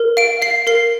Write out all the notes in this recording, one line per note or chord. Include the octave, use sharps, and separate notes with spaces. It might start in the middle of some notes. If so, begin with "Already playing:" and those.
Already playing: A#4
F5 D7
F5 C7
A#4 C7